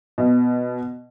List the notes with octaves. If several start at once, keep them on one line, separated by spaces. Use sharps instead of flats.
B2